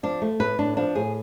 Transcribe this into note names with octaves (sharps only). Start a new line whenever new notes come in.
F3 D4
A3
A2 B4
A2 D4
F3 D4
A2 G#4